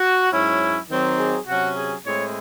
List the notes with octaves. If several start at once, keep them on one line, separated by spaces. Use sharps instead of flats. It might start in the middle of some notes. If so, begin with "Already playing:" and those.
Already playing: F#4
G#2 F#3 C#4 E4
D#3 F#3 C4 D#4
G#4
C3 F#3 C#4 F#4
G#4
A2 G#3 C4 E4 C#5